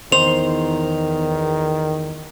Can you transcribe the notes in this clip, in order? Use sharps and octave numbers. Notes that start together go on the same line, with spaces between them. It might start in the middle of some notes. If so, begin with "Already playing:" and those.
E2 D#3 D#4 C5 F7